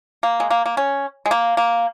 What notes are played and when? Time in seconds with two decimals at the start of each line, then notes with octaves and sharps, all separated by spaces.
0.23 A#3
0.40 G#3
0.50 A#3
0.66 A#3
0.77 C#4
1.26 G#3
1.31 A#3
1.57 A#3